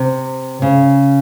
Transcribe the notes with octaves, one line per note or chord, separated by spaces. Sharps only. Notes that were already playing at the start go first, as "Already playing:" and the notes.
Already playing: C3
C#3